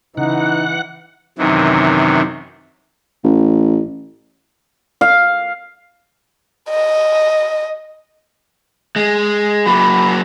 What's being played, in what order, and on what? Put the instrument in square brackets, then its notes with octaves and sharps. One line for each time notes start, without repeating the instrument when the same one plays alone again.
[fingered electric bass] C#3 [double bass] E3 [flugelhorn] D#4 [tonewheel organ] F#5
[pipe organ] F#2 C3 D#3 E3
[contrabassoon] A1
[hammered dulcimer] F5
[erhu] D#5
[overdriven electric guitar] G#3
[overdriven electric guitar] F#3 A#3 [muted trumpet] B5